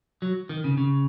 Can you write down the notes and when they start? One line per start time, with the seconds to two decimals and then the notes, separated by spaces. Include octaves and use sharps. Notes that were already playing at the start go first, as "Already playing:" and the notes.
0.22 F#3
0.49 D#3
0.64 C#3
0.77 C#3